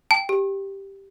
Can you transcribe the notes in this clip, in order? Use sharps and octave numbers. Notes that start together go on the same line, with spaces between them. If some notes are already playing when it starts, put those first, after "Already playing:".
G5 A5
G4